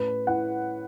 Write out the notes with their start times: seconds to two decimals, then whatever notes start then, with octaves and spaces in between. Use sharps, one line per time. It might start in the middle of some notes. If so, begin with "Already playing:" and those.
Already playing: A2 C#4 B4
0.27 E4 F#5